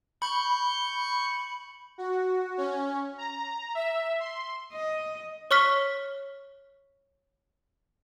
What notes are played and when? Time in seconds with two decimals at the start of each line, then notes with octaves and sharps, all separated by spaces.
0.22 B5 C#6 G6
1.98 F#4
2.57 C#4
3.18 A#5
3.75 E5
4.20 C6
4.72 D#5
5.51 C#5 C#6 F6 B6